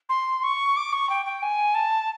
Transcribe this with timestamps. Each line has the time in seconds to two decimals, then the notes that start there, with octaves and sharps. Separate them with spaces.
0.09 C6
0.43 C#6
0.77 D6
0.92 C#6
1.10 G5
1.26 G5
1.42 G#5
1.75 A5